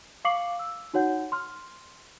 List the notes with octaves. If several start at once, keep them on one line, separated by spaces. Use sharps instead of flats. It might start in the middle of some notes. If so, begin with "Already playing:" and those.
F5 C#6 D6 C7 C#7 F#7
E6
D#4 F#4 C#5 F#5 G6
C6 F6